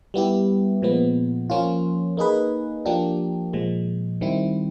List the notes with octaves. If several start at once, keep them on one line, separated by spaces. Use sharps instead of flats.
G3 B3 E4 G4
A#2 F3 G#3 B3
F3 A#3 C#4 F4
A#3 D#4 G#4 B4
F3 A#3 D4 G4
A#2 F3 G#3
D#3 G3 C4 E4